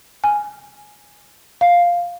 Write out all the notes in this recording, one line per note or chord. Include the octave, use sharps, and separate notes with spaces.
G#5
F5